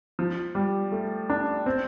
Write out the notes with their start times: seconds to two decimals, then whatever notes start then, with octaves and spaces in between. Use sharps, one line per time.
0.19 F3
0.55 G3
0.92 A3
1.30 D4
1.66 C4